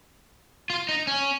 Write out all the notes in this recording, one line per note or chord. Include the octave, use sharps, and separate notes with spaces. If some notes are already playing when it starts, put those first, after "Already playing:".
F4
D#4
C#4